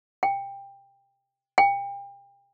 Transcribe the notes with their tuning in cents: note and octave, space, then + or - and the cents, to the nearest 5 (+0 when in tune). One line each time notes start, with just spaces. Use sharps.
G5 +15
G5 +30